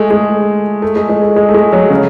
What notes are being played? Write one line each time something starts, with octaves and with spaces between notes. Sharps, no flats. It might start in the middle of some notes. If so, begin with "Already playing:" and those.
Already playing: G#3 A3
G#3
A3
G#3
G#3
A3
G#3
A3
G#3
F#3
C#3